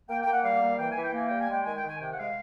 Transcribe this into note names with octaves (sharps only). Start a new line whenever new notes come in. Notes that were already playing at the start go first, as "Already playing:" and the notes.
A#3 G5
A#3 G5
F#5
G3 F5
A#3
E3 G5
G#5
E3
G5
A#3 G#5
G3 G5
G#5
G#3 G5
D#3 G#5
G5
D#3 G#5
C3 G5
F#5
G#3 F5